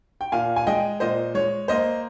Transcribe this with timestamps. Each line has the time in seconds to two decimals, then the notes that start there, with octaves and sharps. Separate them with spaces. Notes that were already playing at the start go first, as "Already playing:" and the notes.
0.21 G5
0.32 A#2 F5 G#5
0.56 G#5
0.67 G#3 D#5 G5
1.00 A#2 C5 D#5
1.34 G#3 C#5
1.68 A#3 C5 D#5